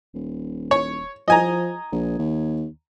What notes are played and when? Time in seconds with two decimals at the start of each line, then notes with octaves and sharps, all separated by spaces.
0.14 D#1
0.71 C#5
1.28 F3 D#5 G#5 A#5
1.92 A#1
2.18 D#2